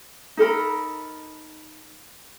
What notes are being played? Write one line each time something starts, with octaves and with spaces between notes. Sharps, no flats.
D#4 A4 A#4 B5